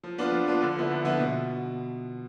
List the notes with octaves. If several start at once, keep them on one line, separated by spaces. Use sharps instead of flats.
F3
B3 D4 F4
F3
B3 D4 F4
D3
F3 B3 E4
D3
F3 B3 E4
B2